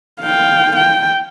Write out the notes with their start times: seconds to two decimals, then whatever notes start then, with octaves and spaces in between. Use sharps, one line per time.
0.21 F5 G5
0.76 G5